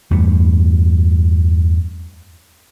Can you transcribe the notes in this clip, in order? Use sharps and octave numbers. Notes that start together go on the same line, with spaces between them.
E2 G2 A3